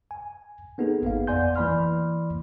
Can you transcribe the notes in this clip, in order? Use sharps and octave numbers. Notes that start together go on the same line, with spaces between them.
G#5
A#3 B3 D#4 G#4 A4
G#1 B3 F5
F2 D5 F#5 G#5 C6 G6
E3 A#3 D5 B5 C6 F6